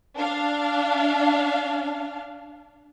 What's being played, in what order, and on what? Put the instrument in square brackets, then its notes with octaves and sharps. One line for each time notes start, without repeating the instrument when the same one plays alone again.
[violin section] D4 F5